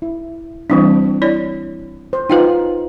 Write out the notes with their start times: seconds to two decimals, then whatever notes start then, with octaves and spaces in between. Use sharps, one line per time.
0.02 E4
0.70 E3 G3 C4 D4 E4
1.22 E4 C#5 D5
2.13 C5
2.30 D#4 F4 B4 F#5 G5